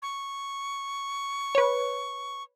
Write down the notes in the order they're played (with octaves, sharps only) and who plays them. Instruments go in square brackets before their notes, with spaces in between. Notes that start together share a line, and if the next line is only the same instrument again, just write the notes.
[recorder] C#6
[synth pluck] B4 C#5